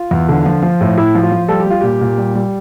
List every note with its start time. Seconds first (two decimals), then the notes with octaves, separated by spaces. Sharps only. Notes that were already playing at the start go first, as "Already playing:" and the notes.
Already playing: F4
0.11 E2
0.29 D3
0.46 F3
0.62 F3
0.81 A2
0.97 A2 E4
1.15 F3
1.23 F4
1.32 F3
1.49 G3 A4
1.60 G4
1.66 G3 F4
1.81 A#2 G4
2.01 A#2
2.18 G3
2.35 G3